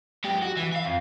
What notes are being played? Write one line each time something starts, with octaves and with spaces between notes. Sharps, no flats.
G#2 G4
F#4
E3
E5 F5
F2